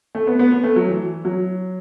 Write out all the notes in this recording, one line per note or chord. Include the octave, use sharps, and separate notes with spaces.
A3
B3
B3
B3
A3
F#3
E3
F#3